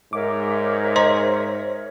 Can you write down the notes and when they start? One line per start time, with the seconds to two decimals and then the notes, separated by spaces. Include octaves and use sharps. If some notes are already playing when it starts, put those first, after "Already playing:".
0.13 G#2 A#4 C#5 E5 D6
0.96 C5 D#5 A#5 C6